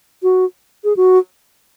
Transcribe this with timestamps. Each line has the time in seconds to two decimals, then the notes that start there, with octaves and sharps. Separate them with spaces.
0.23 F#4
0.84 G#4
0.97 F#4